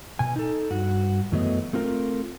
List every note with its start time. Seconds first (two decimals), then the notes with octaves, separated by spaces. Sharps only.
0.19 B2 G#5
0.36 D#4 A4
0.71 G2 F#4
1.32 F#2 E3 F#3 A3 B3 D#5
1.73 A3 C4 F4 A#4